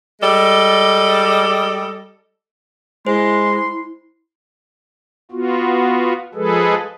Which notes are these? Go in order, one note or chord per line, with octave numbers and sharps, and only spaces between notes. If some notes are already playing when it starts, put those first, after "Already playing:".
G3 G#3 A4 D5 D#5
G#3 E4 C5 C6
B3 F4 F#4
F3 G#3 G#4 A4 B4